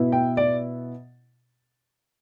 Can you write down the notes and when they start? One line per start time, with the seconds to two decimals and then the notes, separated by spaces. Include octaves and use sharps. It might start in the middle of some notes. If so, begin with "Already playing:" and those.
Already playing: B2 B3 E4
0.12 G5
0.37 D5